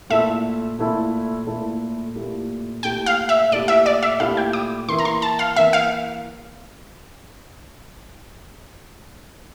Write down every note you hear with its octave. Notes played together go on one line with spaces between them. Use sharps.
A#2 A3 E4 A4 E5
A#2 A3 E4 A4
A#2 A3 E4 A4
A#2 A3 E4 G4
A#2 A3 E4 G4 G5
F5
E5
A#2 A3 E4 G4 D5
E5
D5
E5
A#2 A3 E4 G4 F5
G5
D6
E3 A#3 E4 C6
A#5
C6
A5
F5
E3 A#3 E4 E5
F5